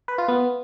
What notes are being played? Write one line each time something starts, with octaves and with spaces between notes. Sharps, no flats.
B4
F4
B3